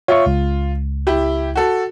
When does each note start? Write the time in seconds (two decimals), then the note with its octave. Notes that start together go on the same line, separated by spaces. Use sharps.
0.08 F4 C#5 E5 C#6
0.26 C#2
1.07 E4 G4
1.56 F#4 A4